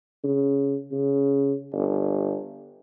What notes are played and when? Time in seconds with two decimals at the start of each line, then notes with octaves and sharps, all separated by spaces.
0.24 C#3
0.92 C#3
1.73 G1